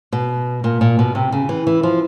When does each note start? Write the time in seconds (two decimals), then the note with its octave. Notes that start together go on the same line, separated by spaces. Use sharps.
0.12 B2
0.64 A#2
0.81 A#2
0.99 B2
1.15 C3
1.32 C#3
1.49 E3
1.67 E3
1.83 F3